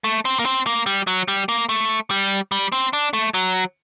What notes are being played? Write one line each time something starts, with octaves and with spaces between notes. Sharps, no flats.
A3
C4
A#3
C4
A#3
G3
F#3
G3
A#3
A3
G3
G3
C4
D4
A3
F#3